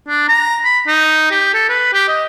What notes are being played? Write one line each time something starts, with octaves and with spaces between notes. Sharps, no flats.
D4
A#5
B5
D#4
G4
A4
B4
G4
D#5